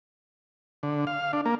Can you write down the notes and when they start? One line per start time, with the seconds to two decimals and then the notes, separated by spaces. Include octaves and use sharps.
0.83 D3
1.07 F5
1.33 D4
1.46 A#3